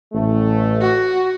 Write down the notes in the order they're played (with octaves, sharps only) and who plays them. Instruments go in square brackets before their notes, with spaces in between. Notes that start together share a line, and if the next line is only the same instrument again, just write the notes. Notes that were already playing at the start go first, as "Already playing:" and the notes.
[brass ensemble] A1 A3
[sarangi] F#4